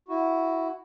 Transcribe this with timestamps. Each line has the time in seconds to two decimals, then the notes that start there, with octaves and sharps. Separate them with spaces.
0.08 E4 F#4